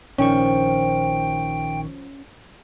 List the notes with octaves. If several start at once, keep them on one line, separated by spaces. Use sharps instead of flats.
A#1 D#3 F3 C#4 D4 G5 C#6